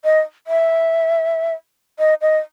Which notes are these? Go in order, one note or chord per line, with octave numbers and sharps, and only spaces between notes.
D#5
E5
D#5
D#5